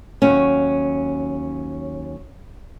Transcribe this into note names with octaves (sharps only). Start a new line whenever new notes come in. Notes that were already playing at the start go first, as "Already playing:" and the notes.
D#2 F#3 C#4